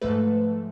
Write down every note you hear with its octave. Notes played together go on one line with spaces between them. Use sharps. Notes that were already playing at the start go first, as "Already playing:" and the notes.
G#2 F3 A3 A4 B4